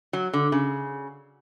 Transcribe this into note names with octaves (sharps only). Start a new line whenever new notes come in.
F#3
D3
C#3